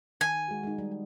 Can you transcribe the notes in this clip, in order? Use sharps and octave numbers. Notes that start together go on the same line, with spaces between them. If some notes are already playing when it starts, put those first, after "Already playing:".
D#3 G#5
G#3 F#4
G#3 D#4
G3